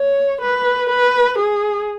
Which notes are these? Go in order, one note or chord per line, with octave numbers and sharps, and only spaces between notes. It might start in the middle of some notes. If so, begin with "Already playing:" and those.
Already playing: C#5
B4
B4
G#4